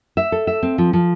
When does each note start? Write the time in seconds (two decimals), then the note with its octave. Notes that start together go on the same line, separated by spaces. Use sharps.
0.17 E5
0.32 A4
0.47 E5
0.63 C4
0.78 F3
0.93 F3